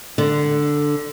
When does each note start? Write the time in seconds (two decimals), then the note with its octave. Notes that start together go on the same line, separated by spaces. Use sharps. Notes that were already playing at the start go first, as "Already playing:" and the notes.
0.18 D3